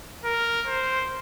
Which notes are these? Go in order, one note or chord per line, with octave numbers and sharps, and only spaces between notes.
A#4
C5